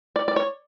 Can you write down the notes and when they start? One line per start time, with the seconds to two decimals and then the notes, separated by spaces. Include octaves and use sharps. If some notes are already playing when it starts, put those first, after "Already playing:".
0.16 D5
0.28 D5
0.36 C#5